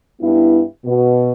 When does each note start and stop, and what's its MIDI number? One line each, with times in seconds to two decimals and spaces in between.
0.21 0.62 43
0.21 0.62 59
0.21 0.62 64
0.85 1.32 47